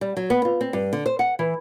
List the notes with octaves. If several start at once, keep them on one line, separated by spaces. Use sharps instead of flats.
G3
F#3
B3
F4
C4
G2
D3
C5
F#5
E3